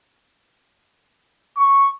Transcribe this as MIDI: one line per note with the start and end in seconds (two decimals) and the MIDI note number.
1.57 1.88 85